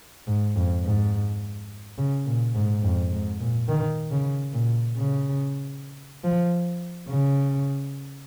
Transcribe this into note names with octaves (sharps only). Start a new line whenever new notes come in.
G#2
F2
G#2
C#3
A#2
G#2
F2
G#2
A#2
D#3
C#3
A#2
C#3
F3
C#3